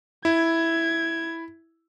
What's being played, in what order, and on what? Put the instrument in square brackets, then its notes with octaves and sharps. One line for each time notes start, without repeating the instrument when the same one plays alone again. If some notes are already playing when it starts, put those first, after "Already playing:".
[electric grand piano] E4 [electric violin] G#6